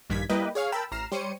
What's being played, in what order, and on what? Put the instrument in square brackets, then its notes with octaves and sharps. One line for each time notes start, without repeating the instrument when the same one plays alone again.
[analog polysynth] A#1 G2 D#3 G#6 B6
G3 A#3 E4 B4 D#5 G5
G#4 C#5 F5 F6
A#4 G5 A5 B5 E6
A1 A#5 F6 C7 E7
G3 C5 C#5 C#7 D#7